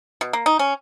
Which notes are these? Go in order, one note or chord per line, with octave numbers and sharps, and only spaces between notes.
B2
A#3
D#4
C#4